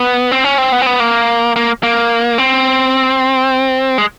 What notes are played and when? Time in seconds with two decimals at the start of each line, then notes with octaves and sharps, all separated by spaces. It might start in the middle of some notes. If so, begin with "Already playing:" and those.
Already playing: B3
0.31 C4
0.44 C#4
0.58 C4
0.72 B3
0.82 C4
0.87 B3
1.00 A#3
1.56 A#3
1.83 A#3
2.38 C4
3.98 G#3